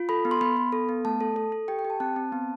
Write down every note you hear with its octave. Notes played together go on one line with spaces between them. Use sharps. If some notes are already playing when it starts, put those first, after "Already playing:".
Already playing: F4
A4 B5
B3
C6
B3 B5
B3
A4
B3
A3 A5
A4
A4
A4
G4 G5
G5
G4
A5
C4 A5
C4
B3